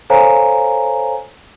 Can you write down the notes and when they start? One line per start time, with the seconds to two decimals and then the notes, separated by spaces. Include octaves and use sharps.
0.10 A4 C5 C#5 F5 G#5 A#5